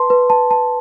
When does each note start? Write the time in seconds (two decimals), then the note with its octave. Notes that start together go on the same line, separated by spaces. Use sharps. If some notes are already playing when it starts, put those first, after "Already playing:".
Already playing: B4 A5 C6
0.10 B4
0.30 A5
0.51 A5